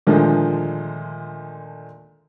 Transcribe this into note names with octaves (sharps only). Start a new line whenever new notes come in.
A#2 D3 D#3 F3 G#3 A3